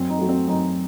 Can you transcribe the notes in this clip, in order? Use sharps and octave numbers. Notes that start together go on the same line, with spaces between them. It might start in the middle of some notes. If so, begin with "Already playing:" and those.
Already playing: F#2 C4
D#4
F#3 A3
C4
F#2 D#4